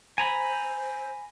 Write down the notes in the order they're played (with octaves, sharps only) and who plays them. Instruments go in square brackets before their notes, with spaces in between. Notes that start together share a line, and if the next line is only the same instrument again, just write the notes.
[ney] C5 [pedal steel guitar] G#5 A#5 B5